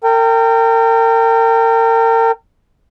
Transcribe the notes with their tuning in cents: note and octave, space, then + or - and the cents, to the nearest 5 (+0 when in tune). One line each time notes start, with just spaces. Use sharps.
A#4 -35 G5 +0